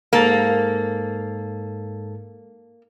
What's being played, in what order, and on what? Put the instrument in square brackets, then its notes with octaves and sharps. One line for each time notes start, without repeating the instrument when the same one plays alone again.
[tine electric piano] G#2 A4 A6 [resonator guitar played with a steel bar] A#3